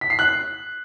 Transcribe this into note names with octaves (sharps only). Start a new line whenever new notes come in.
B6
C7
F#6